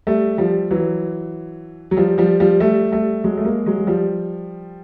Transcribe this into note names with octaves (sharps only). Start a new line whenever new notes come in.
G3 A3
F3 G3
E3 F#3
F#3
F3 G3
F3 G3
F3 G3
G3 A3
G3 A3
F#3 G#3
A3
G#3 A#3
F#3 G#3
F#3
F3 G3